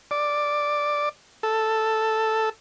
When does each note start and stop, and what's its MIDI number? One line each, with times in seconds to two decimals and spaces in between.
0.11 1.09 74
1.43 2.49 69